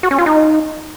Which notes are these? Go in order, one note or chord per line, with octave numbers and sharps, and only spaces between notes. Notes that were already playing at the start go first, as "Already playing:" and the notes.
F#4
C#4
F4
D#4